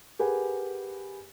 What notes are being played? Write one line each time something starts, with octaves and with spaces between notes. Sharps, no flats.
G4 G#4 A#4 B4 F#5 G#5